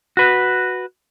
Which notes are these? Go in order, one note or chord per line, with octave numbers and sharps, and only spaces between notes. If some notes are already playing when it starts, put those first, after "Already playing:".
F#4 B4